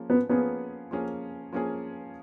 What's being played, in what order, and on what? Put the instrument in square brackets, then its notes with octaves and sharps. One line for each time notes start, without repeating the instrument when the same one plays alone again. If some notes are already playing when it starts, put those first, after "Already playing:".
Already playing: [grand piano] F3 A#3 C#4 G#4
[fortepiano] B3
[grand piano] F3 A#3 C#4 G#4 [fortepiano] B3
[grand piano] F3 A#3 C#4 G#4
F3 A#3 C#4 G#4